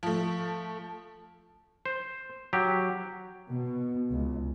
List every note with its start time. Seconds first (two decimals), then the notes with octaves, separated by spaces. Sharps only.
0.03 F3 A3
1.86 C5
2.53 F#3 G4
3.50 B2
4.10 C#2